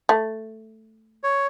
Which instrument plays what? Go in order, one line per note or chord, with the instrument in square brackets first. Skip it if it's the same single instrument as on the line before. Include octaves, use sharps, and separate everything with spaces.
[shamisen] A3
[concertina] C#5